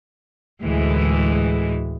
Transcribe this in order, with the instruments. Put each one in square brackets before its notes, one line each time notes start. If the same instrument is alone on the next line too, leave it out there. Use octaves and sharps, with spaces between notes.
[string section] D2 A2 E3 G#3